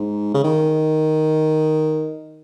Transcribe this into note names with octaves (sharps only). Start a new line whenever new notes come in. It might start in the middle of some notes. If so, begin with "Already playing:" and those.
Already playing: G#2
C#3
D#3